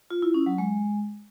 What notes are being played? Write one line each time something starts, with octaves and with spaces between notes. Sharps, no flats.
F4
E4
C#4
F#3
G#3